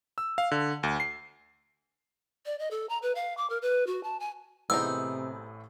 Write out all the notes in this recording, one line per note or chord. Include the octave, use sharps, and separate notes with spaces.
E6
F5
D3
D2
C7
D5
D#5
A4
A#5
B4
F5
D6
A#4
B4
F#4
A5
G#5
A1 A2 C3 B3 C4 D#4 G#4 E6